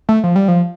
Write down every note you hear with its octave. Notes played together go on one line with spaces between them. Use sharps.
A3
F3
G3
F3